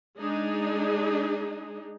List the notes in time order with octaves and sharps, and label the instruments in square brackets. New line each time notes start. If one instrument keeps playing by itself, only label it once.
[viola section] G#3 D4 D#4 G#4